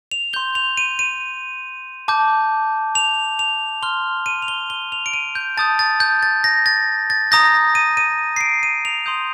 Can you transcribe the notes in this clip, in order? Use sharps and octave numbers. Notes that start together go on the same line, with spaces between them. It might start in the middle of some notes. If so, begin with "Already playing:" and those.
F7
C6 G6 G7
F7
D#7
D#7
A5 D6 G6
F7
F7
C6 F6 G7
D#7
F7
G7
G7
F7
D7
D#7
G6
A5 D#6 G6 A6
A6
G6
A6
A#6
A6
A6
A#5 D#6 G6 A#6
D#7
D#7
C7
D7
D#7
F7
C6 D#6 G6